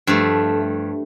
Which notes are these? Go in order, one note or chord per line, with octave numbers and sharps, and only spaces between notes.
G2 F3 A3